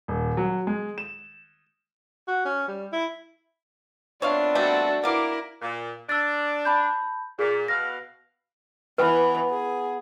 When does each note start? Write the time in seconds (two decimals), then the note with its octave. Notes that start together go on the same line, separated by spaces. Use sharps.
0.08 D#1
0.37 F#3
0.67 G#3
0.98 E7
2.28 F#4
2.45 C#4
2.68 G3
2.93 E4
4.22 B3 C4 D4 F4 C#5 E5 F5
4.55 G3 A3 A#3 F#4 A5
5.04 B3 E4 A#4 F5 D6
5.61 A#2
6.09 D4 E6 A6
6.65 A5 B5 G6
7.39 A#2 G#4
7.68 B2 F5 A#6
8.98 E3 B3 B4
9.51 G#4